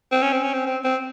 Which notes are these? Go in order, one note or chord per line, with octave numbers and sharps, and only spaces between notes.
C4
C#4
C4
C#4
C4
C4
C4